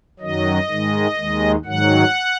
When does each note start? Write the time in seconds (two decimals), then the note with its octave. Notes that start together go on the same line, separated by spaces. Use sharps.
0.19 F#2 D#3 F#3 D#5
0.69 G#2 D#3 G#3
1.17 D#2 D#3 G#3
1.65 G#2 D#3 F#3 F#5